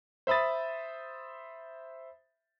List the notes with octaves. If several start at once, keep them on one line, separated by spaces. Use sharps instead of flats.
C5 E5 B5 D#6 A6